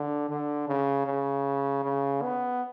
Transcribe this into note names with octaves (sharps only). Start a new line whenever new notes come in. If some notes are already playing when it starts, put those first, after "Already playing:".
Already playing: D3
D3
C#3
C#3
C#3
B3